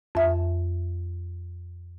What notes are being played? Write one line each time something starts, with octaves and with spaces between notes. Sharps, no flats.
F2 E5